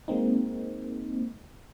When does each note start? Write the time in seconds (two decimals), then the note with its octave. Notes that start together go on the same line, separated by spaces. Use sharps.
0.08 G#3 A#3 C4 D#4